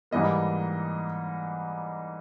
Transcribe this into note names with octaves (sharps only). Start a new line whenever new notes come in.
G#2 E3 G3 A#3 D#5